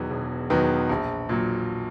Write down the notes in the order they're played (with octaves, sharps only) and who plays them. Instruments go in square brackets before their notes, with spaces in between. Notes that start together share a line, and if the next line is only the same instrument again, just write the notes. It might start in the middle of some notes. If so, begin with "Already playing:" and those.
Already playing: [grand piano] E1 E2 D#3 F#3 B3
E1
E2 D#3 F#3 B3
A#1
A#2 F#3